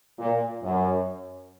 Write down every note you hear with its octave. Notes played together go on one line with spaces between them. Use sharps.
A#2
F#2